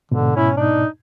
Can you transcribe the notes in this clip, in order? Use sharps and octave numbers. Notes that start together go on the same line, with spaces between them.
G#2 B2 D3
C#4 E4
D4 D#4